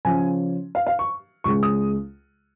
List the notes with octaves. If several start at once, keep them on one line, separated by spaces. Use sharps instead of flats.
C#3 F3 C#4 G#5
F5
F5
C#6
C#2 C#3 G#3 C#6
D#6